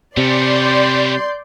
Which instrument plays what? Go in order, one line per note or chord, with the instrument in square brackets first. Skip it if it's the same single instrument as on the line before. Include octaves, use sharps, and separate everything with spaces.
[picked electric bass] C3 [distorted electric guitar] G3 C#4 [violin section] D5 C6 G6